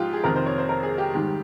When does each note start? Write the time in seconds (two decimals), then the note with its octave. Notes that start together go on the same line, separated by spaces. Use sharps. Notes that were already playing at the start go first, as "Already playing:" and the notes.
Already playing: G#2 F3 F4 G4
0.13 G#4
0.24 F2 C3 D#3 A#4
0.36 C5
0.46 C#5
0.58 C5
0.69 A#4
0.83 G#4
0.98 G4
1.14 G#2 D#3 G3